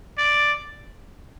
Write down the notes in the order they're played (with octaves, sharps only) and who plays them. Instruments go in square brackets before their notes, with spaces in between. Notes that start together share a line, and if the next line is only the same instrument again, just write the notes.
[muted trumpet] D5